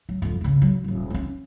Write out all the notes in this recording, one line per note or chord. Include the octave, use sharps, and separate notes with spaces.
F#3
E1 F2
C#3 G#3
F#3
D#1 C2
B3 C#4